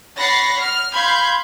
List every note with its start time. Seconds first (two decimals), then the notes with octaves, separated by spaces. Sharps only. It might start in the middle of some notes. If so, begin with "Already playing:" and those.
0.17 C#5 F#5 B5 A6 A#6 C7
0.61 F6
0.94 F5 B5 C6 G6 G#6